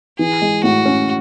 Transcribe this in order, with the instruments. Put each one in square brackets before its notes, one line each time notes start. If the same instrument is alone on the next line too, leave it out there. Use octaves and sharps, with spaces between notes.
[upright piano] E3 [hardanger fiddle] G#4
[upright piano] G#3
[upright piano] A2 [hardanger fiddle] F#4
[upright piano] C#4